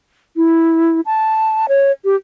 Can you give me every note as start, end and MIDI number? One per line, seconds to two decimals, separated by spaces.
0.37 1.01 64
1.06 1.66 81
1.68 1.91 73
2.05 2.16 67